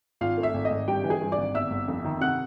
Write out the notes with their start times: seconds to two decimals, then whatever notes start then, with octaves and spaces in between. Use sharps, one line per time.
0.21 G#1 F4 F5
0.38 A3
0.43 E5
0.54 G#1
0.65 D#5
0.70 G#1
0.88 G2 G4 G5
1.04 E3
1.10 G#4 G#5
1.21 G2
1.32 D5 D6
1.38 G#1
1.54 G1 E5 E6
1.71 G1
1.88 F2
2.05 D#3
2.21 C3 F#5 F#6